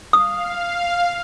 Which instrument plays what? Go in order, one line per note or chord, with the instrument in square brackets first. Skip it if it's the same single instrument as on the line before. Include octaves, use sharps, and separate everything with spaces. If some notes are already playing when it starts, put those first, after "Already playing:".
[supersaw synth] F5 [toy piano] D#6